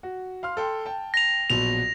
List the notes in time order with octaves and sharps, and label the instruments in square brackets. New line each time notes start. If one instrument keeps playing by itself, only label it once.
[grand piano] F#4
F5 C6 F6
A4 G5 C6
G5 A5
[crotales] A#6 F7
[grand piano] A#1 B2 F#3 [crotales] F7